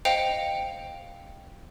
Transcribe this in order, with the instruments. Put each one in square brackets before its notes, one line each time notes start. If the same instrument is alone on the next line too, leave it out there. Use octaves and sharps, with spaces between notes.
[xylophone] C5 D#5 F5 G5 C#7 F7